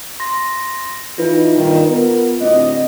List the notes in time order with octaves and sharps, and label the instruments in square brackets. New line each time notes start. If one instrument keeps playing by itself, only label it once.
[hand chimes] C6 A#6
[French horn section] E3 D#4 [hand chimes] F4 B4
[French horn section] G2 A#2 D#3
B3 A#4
[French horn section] D2 A2 D#5 [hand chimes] C4